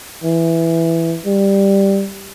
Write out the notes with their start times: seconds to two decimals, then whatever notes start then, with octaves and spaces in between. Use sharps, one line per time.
0.24 E3
1.26 G3